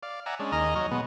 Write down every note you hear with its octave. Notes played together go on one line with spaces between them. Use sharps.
D5 F5
D5 E5 F#5 G#5 A#5
G#3 C#4 D4
D#2 D#4 G#4 D#5 A#5 F6
F#3 D#4 C#5 D#5
B2 G#3 B3